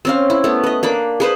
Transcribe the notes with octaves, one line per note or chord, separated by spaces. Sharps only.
C4 C#4 F5
E4
A3 B3
B4 D#5
A#3 D4 B5
G#4 B4 C5